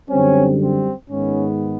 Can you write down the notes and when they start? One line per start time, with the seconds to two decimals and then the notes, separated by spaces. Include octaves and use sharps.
0.10 F#2 D3 G3 C4 C#4
0.61 C4
1.10 G#2 D#3 G#3 B3 C#4